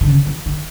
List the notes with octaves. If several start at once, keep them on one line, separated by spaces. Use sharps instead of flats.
D#3
C#3
E3
D#3